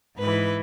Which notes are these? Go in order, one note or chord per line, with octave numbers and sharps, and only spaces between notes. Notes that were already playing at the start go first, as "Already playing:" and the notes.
G#2 E3 B4